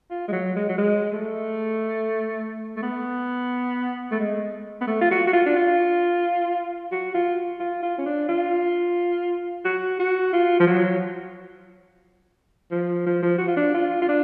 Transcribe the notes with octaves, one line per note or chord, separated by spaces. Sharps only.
F4
G#3
F#3
G#3
F#3
G#3
A3
A3
B3
A3
G#3
B3
A3
F4
F#4
F#4
F4
D4
F4
F#4
F4
F4
F4
C#4
D4
F4
F#4
F#4
F4
F3
F#3
F3
F3
F3
F#4
F4
D4
F4
F4
D4